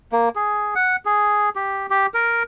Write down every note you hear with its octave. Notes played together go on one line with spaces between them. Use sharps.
A#3
G#4
F#5
G#4
G4
G4
A#4